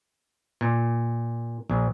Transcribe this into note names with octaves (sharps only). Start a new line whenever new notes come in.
A#2
A#1